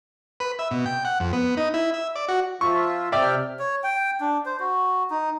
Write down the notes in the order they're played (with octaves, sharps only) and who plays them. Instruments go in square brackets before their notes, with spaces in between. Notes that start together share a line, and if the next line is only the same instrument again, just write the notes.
[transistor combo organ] B4
E5
B2
G5
F#5
F2
B3
D#4
E4
E5
D5
F#4
[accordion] F3 F4 E5 [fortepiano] C#6
[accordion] C3 G5 F6 [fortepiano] D5 E5
[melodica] C#5
G5
D4
C5
F#4
D#4